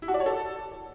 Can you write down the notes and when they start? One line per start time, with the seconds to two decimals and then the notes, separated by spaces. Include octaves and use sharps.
0.02 E4
0.08 F#4
0.14 D5
0.20 C#5
0.26 A4